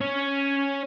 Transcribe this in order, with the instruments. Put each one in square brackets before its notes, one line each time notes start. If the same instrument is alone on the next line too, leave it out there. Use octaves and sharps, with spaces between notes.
[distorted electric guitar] C#4 C#5